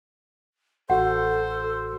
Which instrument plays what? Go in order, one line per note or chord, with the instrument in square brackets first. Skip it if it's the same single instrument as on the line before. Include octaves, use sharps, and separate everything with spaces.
[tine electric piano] A1 F#4 [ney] A4 [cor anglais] C5 [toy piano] F#5